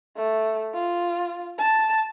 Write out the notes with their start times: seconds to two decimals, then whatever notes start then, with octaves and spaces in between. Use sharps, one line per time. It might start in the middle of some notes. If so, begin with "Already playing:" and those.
0.17 A3
0.74 F4
1.58 A5